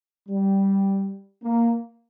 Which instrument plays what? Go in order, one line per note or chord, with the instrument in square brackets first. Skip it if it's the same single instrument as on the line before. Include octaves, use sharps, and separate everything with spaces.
[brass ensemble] G3
A#3